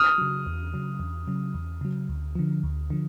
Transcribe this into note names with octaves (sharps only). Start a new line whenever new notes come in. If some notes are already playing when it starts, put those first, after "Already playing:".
Already playing: D#6 F6
C#3 F#3
E2
C#3 F#3
E2
C#3 F#3
E2
C#3 F#3
D2
D3 F3
D2
D3 F3